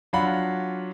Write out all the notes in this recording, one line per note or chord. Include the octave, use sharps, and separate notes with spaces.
F#3 D4 F4 F5 F#5 B5